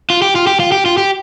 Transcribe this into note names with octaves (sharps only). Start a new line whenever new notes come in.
F4
G4
F4
G4
F4
G4
F4
G4